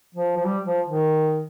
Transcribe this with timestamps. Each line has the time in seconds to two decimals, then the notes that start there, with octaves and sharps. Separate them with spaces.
0.14 F3
0.37 F3
0.45 G3
0.66 F3
0.87 D#3